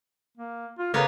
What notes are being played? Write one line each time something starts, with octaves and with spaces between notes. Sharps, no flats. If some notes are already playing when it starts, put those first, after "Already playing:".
A#3
F4
C#3 A#3 B3 C#5